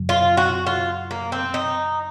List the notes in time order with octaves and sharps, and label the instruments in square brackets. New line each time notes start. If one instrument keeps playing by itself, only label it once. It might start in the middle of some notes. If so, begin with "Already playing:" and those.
Already playing: [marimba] F#2 C#3 F#3
[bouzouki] F4
F#4
F4
A#3
C4
D#4